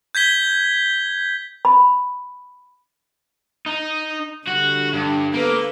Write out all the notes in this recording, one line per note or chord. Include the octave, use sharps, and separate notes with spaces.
G6 G#6 B6 G7
B5
D#4
D3 G3 D4 F#4
G2
A#3 B3 A4 B4